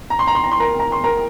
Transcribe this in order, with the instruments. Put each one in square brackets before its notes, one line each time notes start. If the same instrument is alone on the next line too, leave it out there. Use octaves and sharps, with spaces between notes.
[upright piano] A#5
C6
A#5
C6
A#5
C6
A#4 A#5
A#5
C6
A#4 A#5